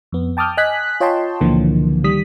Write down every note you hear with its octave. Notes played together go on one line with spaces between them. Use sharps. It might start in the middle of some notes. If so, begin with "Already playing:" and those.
F2 B3
G5 A5 D6 D#6 F6 G6
D#5 G#5 F#6 B6
F4 C#5 D#5 G5 A5 C6
C#2 A#2 D3 E3 F3 A#3
D#3 G3 D#6 B6